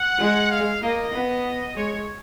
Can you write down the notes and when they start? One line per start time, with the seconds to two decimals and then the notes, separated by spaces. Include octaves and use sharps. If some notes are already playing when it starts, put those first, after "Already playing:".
Already playing: F#5
0.18 G#3
0.51 F5
0.81 A#3 D#5
1.12 B3
1.75 G#3 C#5